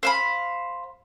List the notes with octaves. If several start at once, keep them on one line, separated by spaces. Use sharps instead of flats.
C5 F5 B5